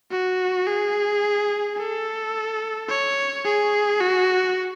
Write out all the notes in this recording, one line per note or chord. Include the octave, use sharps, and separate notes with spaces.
F#4
G#4
A4
C#5
G#4
F#4